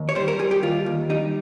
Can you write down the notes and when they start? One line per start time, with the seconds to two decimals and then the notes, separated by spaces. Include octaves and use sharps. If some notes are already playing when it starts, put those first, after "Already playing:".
Already playing: D#2
0.09 C#5
0.15 G3 C5
0.28 A#4
0.39 G3 G#4
0.51 G4
0.63 D#2 F4
0.86 D#2
1.10 G3 D#4